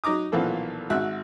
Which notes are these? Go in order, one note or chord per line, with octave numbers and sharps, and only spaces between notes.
F#3 D#4 A#5 D6 D#6
B1 A#2 E3 F3 A#3 A4
G#1 F#4 E5 F#6